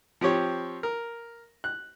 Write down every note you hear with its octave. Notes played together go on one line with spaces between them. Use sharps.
F3 C4 G4 C#5
A#4
F#6